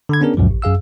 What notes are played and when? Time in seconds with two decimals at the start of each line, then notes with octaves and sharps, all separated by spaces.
0.09 D3 B5 G#6
0.21 B3 C#4 D4 G#4 A#4
0.37 C#2 F#2 A#2 F3
0.50 A1
0.62 F#2 G#4 F5 E6